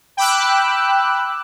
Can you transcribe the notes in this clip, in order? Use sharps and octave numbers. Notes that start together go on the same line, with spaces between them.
G5 B5 D6 E6 F#6